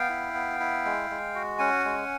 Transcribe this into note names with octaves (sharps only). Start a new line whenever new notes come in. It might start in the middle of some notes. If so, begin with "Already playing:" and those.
Already playing: B3 F5 G5
E4
B3
E4
G#3
G#3
F#4
C#4 F#5 G#5
G#3